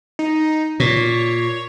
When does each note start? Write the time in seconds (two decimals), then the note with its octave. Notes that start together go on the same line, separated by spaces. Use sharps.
0.19 D#4
0.80 A#2 C#5